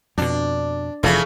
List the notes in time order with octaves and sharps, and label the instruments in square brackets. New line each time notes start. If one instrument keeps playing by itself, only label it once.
[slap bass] F2 B2 [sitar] D4
[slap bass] F1 F2 [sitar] C#3 E3 A3